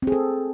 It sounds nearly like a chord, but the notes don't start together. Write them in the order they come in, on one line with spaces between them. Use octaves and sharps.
C4 G#4 A4